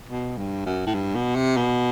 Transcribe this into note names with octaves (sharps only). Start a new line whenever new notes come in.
B2
G2
F#2
A2
G2
B2
C3
B2